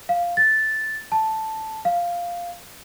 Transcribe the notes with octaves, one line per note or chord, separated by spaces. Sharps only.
F5
A6
A5
F5